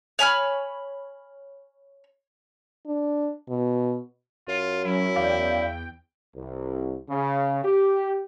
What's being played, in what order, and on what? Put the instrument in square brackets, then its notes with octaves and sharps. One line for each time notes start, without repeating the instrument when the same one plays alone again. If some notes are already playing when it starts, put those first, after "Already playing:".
[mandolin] C#5 G#5 B5 F6
[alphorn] D4
B2
[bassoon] F#2 [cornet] F4
[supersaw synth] F#3 C#4 [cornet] E4
[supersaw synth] E2 G5 [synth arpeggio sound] D5 F5
[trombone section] C2
C#3
G4